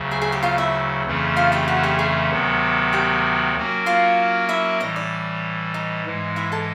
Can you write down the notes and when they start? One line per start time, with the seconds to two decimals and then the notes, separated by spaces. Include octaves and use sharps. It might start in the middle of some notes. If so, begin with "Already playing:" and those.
Already playing: D2 C#3 F#3
0.11 G#4 G#5
0.21 G#4 G#5
0.32 G4 G5
0.43 F4 F5
0.58 E4 E5
1.05 F2 C#3 E3 A3 C#4
1.37 F4 F5
1.52 G4 G5
1.68 F#4 F#5
1.83 G4 G5
1.99 G#4 G#5
2.30 D2 C3 D#3 F#3 B3
2.93 G4 G5
3.55 F#3 A#3 C#4 F#4 A#4
3.86 F4 F5
4.49 E4 E5
4.80 A2 E3 G3 D#4 D#5
4.96 D5
5.74 D#4 D#5
6.05 G#2 E3 G#3
6.36 E4 E5
6.52 A4 A5